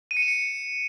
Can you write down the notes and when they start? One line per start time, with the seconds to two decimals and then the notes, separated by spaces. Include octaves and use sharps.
0.11 D#7
0.17 C#7
0.22 E7
0.28 C#7